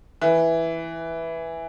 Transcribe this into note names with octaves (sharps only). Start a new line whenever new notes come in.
E3